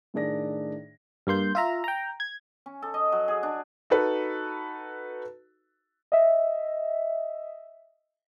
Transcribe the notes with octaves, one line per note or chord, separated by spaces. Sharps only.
A2 D#3 D4 G#4 D5 A#6
G2 A#3 C6 G6
F4 E5 A#5
G5 A#5
G#6
C#4
A4
D#5
F#3
G#4
D4
D#4 F#4 A4 B4
D#5 E5